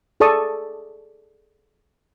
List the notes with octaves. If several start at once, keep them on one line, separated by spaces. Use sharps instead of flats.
G#4 A4 D5 A5 C#6 D#6